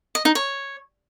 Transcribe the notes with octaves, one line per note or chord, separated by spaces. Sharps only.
D#5
D#4
C#5